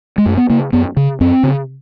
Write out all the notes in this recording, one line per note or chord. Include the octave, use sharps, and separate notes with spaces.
G#3
F#2 A3
B3
C#3 A#3
F#2 B3
C#3
F#2 C4
C#3